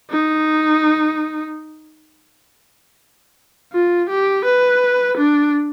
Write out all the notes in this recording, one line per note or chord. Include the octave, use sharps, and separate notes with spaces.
D#4
F4
G4
B4
D4